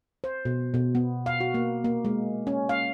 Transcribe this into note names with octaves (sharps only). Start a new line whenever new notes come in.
C5
B2
B2
B3
F5
F#4
A#3
A#3
G#3
C#4
F5